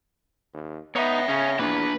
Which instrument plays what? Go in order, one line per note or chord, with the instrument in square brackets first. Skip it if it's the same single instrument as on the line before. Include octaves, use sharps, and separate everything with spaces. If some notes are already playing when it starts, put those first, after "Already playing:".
[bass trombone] D#2
[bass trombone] B3 [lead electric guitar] D#4 [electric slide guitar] C#5 E5
[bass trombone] C#3 [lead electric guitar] C#4
[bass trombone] E2 [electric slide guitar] A#3 D4 [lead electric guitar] B4